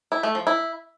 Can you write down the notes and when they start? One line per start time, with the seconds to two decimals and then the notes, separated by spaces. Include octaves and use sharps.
0.12 E4
0.23 A3
0.35 F3
0.47 E4